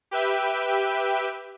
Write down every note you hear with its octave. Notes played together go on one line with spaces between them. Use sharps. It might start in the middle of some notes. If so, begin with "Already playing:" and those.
G4 B4 E5 G5